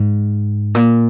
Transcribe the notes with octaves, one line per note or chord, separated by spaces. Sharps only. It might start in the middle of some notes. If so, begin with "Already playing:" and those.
Already playing: G#2
A#2